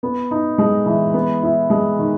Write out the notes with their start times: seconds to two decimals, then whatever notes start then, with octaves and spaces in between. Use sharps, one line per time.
0.03 B3
0.31 D#4
0.58 G#3
0.86 E3
1.14 B3
1.43 E4
1.70 G#3
1.99 D#3